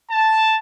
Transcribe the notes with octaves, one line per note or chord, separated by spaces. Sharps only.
A5